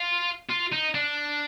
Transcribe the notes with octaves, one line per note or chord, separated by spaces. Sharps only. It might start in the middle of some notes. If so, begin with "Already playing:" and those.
Already playing: F4
F4
D#4
D4